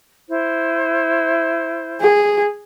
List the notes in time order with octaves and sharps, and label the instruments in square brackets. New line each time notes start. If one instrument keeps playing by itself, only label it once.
[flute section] E4 C5
[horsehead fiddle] G#4